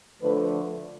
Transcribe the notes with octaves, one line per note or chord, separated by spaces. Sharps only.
D3 F3 A3 B4